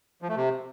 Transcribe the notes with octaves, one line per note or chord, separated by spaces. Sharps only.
F3
A3
C3